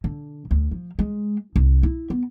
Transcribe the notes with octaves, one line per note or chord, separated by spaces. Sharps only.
D3
D2
F3
G#3
C2
E4
B3